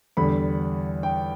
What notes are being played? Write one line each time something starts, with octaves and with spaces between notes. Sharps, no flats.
E2 D3 G3 B5
G5